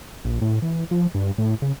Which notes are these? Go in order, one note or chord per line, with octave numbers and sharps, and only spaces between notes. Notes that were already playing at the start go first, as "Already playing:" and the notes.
A#1
A2
E3
F3
G2
A2
C#3